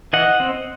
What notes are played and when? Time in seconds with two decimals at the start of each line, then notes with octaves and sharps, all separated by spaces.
0.13 E3 D#5 F#5
0.40 C4